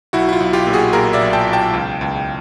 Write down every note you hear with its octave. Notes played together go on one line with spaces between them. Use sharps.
B1 E4 F#4
E4
F4
B1
F4 G4
A#2
F#4 G#4
A#2 G#4 A#4
D5 E5
B1
G5 A5
B1
G5 A5
C#2
C#2